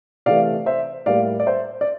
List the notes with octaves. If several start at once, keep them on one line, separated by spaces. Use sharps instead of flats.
C3 E3 A3 D5 F5
C5 E5
A2 G3 A#3 D5 F5
D5
C5 E5
D5